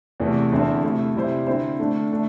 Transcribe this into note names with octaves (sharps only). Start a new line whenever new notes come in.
E2 C3 E3 A3
E2 D3 C4 E4 A4
C3 A3 E4
C3 G3 E4 C5
D3 C4 E4 C5
D3 A3 D4
D3 A3 D4